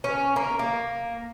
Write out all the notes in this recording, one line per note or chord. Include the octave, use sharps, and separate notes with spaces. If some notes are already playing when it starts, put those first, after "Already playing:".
C#4
A#3
A#3